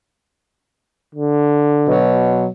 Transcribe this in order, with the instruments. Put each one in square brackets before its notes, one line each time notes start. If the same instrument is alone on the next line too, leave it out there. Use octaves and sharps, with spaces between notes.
[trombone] D3
[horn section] B2 F#3